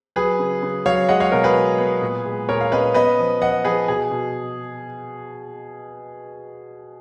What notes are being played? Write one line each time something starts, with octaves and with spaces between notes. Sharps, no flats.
F#3 G#4 B4
C#3
C#3
F#3 C#5 F5
G#3 D#5 F#5
C#5 F5
B2 A#4
G#4 B4
B3
B3
A#2
G#3
A#2 A#4 C#5
F5
C#4 B4 D#5
B3 B4 D#5
F3
F3 D#5 F#5
F3 G#4 B4
B2 G#4
B2